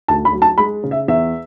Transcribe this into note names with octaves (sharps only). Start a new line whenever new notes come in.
D2 A5
B5
F#3
A5
G#3 B5
C#3
E5
E2 E5